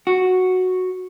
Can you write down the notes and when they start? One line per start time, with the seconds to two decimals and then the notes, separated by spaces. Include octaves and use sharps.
0.07 F#4